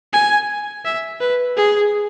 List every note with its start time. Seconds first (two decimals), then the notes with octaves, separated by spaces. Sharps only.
0.13 G#5
0.85 E5
1.21 B4
1.56 G#4